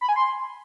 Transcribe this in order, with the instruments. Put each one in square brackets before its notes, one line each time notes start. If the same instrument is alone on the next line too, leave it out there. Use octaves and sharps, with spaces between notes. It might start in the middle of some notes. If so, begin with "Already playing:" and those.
[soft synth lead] B5
G#5
C6